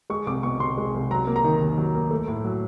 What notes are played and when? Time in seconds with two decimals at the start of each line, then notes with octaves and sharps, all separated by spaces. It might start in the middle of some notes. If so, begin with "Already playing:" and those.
0.10 G#3 C#6
0.27 C2 D6
0.43 B2 C#6
0.60 C2 C6
0.77 G#3
0.94 C2
1.11 F#3 A#5
1.27 A#3
1.36 A#5
1.44 D#3
1.62 D#2
1.78 F#3
1.94 A#3
2.11 A3
2.28 A2
2.44 F#3